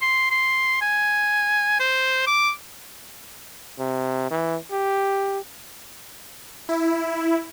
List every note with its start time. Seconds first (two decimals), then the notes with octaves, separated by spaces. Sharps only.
0.01 C6
0.31 C6
0.81 G#5
1.80 C5
2.27 D6
3.79 C3
4.31 E3
4.72 G4
6.69 E4